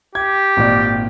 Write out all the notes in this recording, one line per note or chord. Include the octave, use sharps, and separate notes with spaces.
G4 G#6
G#1 A#2 D5